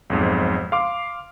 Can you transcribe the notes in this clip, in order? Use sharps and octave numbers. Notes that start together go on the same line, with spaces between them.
B1 F2 G#2
F5 C6 D6